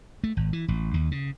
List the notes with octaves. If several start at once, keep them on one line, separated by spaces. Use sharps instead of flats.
A3
G#1
E3
A1
D#2
C#3